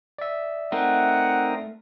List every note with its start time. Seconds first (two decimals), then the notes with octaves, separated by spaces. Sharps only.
0.18 D5 E5
0.72 A3 C4 D#4 A#4 F#5